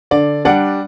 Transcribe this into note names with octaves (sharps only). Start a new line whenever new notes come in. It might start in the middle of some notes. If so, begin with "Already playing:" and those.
D3 D5
G3 D4 D5 F#5